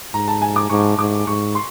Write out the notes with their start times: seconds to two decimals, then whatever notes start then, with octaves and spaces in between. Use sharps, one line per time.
0.14 G#2 A#5
0.28 A5
0.42 G#5
0.56 D6
0.70 G#2 C#6
0.98 G#2 D6
1.27 G#2 C#6
1.55 C6